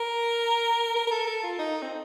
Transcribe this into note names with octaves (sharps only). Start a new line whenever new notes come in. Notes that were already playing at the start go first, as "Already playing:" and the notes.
Already playing: A#4
A#4
A#4
A4
A4
F4
D#4
C4